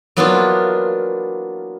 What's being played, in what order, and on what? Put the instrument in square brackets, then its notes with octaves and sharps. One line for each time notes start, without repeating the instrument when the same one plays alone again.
[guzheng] F#3 A#3 B3 D4 E4 F4